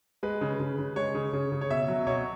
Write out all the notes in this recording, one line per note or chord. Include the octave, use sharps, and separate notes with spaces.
G#3 B4
C#3
C#3
C#3
G#3 C#5
C#3
C#3
C#3
C#5
B2 E5
F#3
B2 C#5